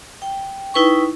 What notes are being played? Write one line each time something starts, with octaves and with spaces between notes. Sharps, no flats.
G5
D#4 E4 B4 G5 C#6